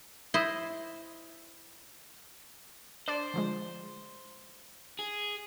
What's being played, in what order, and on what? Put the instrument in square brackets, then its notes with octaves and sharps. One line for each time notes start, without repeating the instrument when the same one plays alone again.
[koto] E4 C5 D#5
[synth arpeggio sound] D4 D5 [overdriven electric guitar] C5
[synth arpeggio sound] D3 F3 G#3
[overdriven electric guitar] G#4